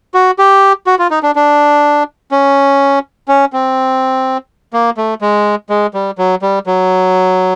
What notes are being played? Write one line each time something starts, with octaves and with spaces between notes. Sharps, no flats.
F#4
G4
F#4
F4
D#4
D4
D4
C#4
C#4
C4
A#3
A3
G#3
G#3
G3
F#3
G3
F#3